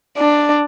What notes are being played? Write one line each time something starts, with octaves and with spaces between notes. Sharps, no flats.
D4